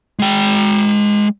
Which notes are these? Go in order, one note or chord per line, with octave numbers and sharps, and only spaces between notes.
G#3 G5